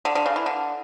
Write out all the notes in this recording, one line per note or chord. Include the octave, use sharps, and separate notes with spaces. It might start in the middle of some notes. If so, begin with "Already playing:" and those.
D3
D3
C#3
E3
D3